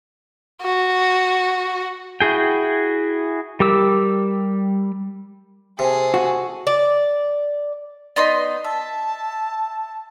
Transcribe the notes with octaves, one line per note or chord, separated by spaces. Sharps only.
F#4
E4 F#4 G#4 G5
G3 G4 A#4 D6 E6
C3 G#4 A4
F#4
D5
B3 D#4 D5 D#5 C6
E5 A5